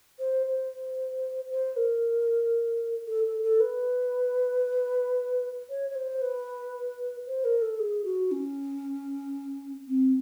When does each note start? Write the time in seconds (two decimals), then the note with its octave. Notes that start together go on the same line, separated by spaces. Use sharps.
0.19 C5
0.46 C5
1.50 C5
1.76 A#4
3.07 A4
3.24 A4
3.42 A4
3.60 B4
5.69 C#5
5.89 C#5
5.95 C5
6.21 B4
7.26 C5
7.44 A#4
7.61 A4
7.79 G#4
8.04 F#4
8.31 C#4
9.88 C4